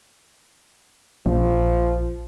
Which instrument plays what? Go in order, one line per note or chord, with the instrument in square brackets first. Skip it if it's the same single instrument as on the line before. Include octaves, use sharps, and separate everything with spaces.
[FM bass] A#1 [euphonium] F3